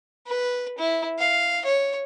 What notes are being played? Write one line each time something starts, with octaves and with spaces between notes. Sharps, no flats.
B4
E4
F5
C#5